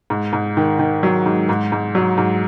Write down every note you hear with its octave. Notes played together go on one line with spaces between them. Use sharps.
G#2
G#2
D#3
D#3
F#3
G#2
G#2
G#2
F#3
G#2